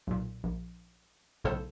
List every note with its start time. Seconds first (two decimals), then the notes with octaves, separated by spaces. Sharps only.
0.07 B1 A#2
0.44 A#1
1.44 B1 A2 C#3 A4 C5